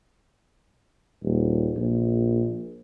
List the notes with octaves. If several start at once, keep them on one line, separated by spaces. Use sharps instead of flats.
D#1
A#1